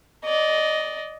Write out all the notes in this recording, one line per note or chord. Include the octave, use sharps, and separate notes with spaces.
D5 D#5